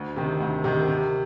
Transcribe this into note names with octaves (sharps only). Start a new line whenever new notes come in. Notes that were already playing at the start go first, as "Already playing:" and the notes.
Already playing: D2
C3 D#3
D2
C3 D#3
C3